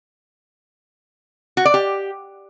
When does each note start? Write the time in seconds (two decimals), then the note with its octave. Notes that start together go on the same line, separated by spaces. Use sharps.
1.57 F#4
1.65 D5
1.74 G4